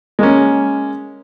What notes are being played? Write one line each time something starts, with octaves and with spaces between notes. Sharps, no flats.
G#3 A#3 C#4